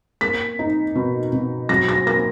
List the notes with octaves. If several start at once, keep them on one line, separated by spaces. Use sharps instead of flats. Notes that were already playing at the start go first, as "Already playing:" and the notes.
A#3 B6
D#4
B2
B2
F#3 A#6
A#6
A#3 A#6